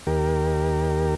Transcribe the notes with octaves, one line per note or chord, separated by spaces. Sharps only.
D#2 G4 A#4